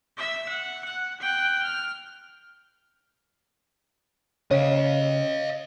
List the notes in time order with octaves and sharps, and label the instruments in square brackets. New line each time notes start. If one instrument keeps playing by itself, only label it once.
[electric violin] E5 E6
F#5
F#5
G5 F#6
F6
[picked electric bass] C#3 [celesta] C#5 [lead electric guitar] D#5 F5